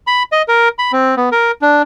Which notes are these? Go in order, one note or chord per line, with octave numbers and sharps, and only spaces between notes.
B5
D#5
A#4
B5
C4
B3
A#4
D4